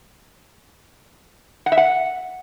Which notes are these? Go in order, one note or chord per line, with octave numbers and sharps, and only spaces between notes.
F#5
E5
F#5